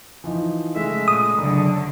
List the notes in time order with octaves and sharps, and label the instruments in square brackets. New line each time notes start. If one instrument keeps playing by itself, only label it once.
[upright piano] E3 F3 D#4
[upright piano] C#3 G#3 A3 [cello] E5
[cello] A#2 [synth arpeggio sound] D#6
[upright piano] F#1 [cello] D3 F#3